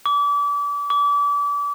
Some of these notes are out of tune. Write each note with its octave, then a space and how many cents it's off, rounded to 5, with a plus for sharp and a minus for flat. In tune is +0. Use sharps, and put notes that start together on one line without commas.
D6 -35
D6 -35